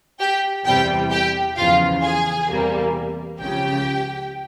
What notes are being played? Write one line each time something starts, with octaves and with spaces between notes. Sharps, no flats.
G4 G5
E2 C3 G3 G4 G5
G4 G5
E2 C#3 F3 F4 F5
G#4 G#5
E2 C3 G3 A#3
C#2 C#3 F3 G4 G5